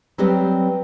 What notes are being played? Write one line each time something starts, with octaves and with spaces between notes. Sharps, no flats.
F#3 G3 C4 G4 B4 D#5